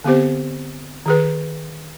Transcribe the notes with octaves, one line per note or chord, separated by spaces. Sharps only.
D3 B3 C4 G4 C5
D#3 G#4 B4